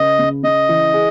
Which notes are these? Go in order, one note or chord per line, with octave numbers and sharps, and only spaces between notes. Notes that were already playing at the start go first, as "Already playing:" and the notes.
Already playing: C#3 B4 D#5
C#3
C#3 D#5
E3
G#4